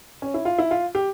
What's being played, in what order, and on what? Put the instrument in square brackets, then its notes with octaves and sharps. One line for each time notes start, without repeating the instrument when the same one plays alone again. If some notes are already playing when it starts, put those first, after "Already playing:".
[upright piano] C#4
E4
F4
E4
F4
G4